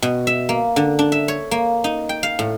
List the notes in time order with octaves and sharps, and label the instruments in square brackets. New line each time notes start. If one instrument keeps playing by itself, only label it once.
[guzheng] B2
E5
A#3
D3
D4
E5
C#5
A#3
D#4
G5
F5
A2